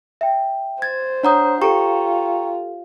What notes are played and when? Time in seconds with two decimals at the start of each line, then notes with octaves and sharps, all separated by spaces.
0.21 E5 G5
0.82 C5 G#6 A6
1.23 D4 C#5 F#5 A#5 D#6 G6
1.61 F4 G4 A4 G5 A#5 C#6